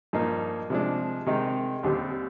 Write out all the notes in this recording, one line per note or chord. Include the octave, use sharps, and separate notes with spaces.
G2 F3 A#3 D#4
C3 F3 G#3 D4
C3 D#3 G#3 D#4
D#2 D3 G3 C4 G4